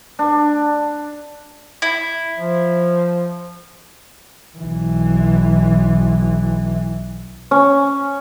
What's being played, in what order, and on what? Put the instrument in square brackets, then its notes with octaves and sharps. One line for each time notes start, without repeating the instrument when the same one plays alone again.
[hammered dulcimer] D4
[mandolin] E4
[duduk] F3
[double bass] B1 E3
[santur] C#4